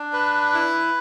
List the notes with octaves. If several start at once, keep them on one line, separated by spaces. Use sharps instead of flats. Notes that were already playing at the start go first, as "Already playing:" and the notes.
Already playing: D4
B4
E4